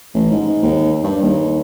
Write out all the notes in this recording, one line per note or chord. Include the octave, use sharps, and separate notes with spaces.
A1
G#2
D#2
G2
D#2